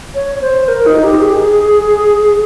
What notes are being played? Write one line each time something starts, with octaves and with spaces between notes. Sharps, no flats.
C#5
C#5
C5
A#4
D#4
G4
G#4